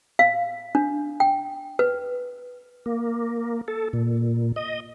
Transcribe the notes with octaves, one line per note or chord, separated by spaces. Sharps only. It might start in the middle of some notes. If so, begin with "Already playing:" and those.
F5
D4
G5
B4
A#3
A4
A#2
D#5